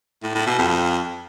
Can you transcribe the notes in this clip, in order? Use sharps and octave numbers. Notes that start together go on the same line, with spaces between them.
A2
A2
B2
F2